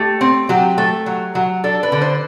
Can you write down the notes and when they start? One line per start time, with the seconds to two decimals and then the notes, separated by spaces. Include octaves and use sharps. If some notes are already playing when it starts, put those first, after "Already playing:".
Already playing: A3 G4
0.21 C4
0.49 F#3 G4
0.78 A3
1.06 F#3
1.35 F#3
1.64 D4 A4
1.83 B4
1.92 D3
2.02 C5